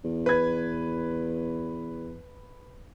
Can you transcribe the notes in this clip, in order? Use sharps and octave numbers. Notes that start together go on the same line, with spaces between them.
E2
B4 G#6